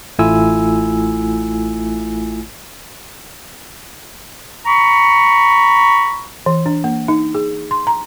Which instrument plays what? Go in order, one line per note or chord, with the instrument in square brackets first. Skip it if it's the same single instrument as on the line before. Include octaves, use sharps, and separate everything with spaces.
[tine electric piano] A1 A3 E4 F4 G#5 E6
[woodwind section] A#5 B5 C#6
[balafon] E3
D4
A#3
D#4
G#4
C6
A#5